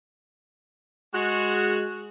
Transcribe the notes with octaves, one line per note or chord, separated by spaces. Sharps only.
G#3 F#4